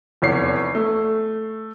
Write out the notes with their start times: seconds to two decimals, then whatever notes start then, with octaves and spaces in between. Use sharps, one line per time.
0.22 F1 E2 C#5 C7
0.75 A3